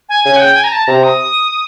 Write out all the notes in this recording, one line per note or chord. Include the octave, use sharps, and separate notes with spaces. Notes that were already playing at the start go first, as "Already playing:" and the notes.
G#5
C#3 G#5
F#5
G5
G#5
A#5
A5
C3 A#5
D#6